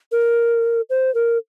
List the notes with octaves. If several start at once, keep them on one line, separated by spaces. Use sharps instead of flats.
A#4
C5
A#4